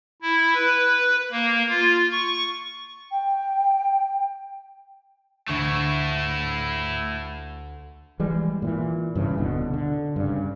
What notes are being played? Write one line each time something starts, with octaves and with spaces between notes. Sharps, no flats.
E4
B4
A#3
F4
C#6
G5
D2 A3 E4 C#6
E3 G3 G#3
A#2 E3
G2 C#3 E3
D1 B2 D3
D3
G2 C#3